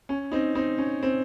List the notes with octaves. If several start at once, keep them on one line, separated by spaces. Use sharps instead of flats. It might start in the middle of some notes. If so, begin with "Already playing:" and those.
C#4
C4 D#4
C4 D#4
C#4
C4